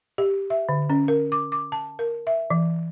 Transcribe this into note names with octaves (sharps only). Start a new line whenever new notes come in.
G4
E5
D3
C#4
A#4
D6
D6
A5
A#4
E5
E3